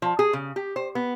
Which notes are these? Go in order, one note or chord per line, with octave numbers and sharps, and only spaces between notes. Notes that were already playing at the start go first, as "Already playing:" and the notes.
F3
G#4
C#3
G4
C5
B3